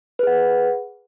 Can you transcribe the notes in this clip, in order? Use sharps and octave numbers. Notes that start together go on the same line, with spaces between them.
G#4 B4 F#5